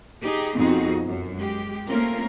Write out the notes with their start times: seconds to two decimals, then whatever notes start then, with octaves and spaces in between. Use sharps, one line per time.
0.21 D#4 G4 G#4
0.55 F2 B2 C4 D#4 F#4 G#4
1.06 F#2
1.37 G#3 G4
1.87 A3 A#3 C4 C#4 F4 A#4